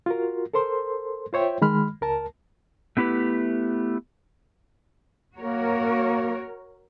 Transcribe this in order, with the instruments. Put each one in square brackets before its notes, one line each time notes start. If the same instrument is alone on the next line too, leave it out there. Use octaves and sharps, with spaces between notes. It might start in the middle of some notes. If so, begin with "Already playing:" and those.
[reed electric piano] F4 F#4 A#4
A4 A#4 C5 C6
F4 C5 C#5 E5 G5
D#3 G#3 B5 F6
C#2 A#4 A5
[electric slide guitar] A3 B3 E4 G4 B4
[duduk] A#3 [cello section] F#4 A#4 C#5